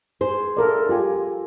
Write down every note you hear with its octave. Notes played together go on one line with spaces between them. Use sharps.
G#4 C5
A4 A#4 D5
F4 G4 G#5